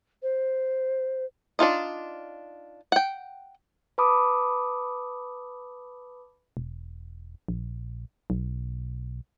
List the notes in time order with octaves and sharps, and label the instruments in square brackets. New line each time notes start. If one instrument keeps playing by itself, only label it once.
[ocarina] C5
[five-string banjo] D4 D#4 F4 D#5
F#5 G5
[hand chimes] B4 A5 B5 D6 D#6
[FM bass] E1
A#1
B1